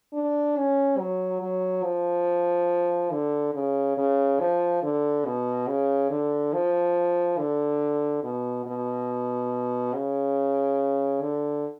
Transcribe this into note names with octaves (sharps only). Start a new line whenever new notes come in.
D4
C#4
F#3
F#3
F3
D3
C#3
C#3
F3
D3
B2
C#3
D3
F3
D3
B2
B2
C#3
D3